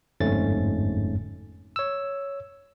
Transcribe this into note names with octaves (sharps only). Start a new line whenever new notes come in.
G1 F2 G#2 A3 C#4 A6
C#5 E6